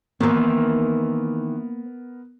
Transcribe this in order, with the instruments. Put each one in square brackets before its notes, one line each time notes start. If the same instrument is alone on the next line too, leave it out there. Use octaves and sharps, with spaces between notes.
[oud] D#3 E3 [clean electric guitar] A#3 C5 [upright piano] B3 A#4